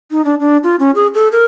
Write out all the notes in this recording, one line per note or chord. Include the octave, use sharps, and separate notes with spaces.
D#4
D4
D4
F4
C#4
G#4
A4
A#4